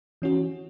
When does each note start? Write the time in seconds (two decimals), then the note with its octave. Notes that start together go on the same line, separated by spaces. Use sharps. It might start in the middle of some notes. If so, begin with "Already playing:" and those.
0.22 E3 C#4 F#4